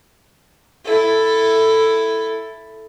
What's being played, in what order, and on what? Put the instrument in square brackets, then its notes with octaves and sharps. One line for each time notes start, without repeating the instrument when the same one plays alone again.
[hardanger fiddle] E4 A4